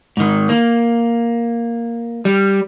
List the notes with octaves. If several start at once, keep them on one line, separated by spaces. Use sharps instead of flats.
G#2 D#3
A#3
G3